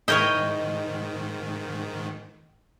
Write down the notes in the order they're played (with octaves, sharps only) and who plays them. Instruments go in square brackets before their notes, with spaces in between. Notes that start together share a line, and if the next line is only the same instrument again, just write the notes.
[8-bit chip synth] G#2 D#3 [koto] E4 A#4 C#5 [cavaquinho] D#5 G5